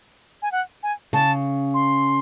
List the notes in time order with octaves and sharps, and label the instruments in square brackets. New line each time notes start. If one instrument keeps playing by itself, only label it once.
[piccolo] G#5
F#5
G#5
[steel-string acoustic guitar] C#3 [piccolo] A5
[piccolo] C6